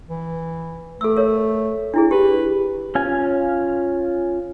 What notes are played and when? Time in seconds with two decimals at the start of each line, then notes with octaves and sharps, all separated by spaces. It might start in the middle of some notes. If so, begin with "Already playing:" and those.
0.09 E3
1.01 A3 A4 E6
1.17 A#4 C#5
1.94 D4 E4 G#4
2.11 G4 B4
2.95 C#4 F4 G#5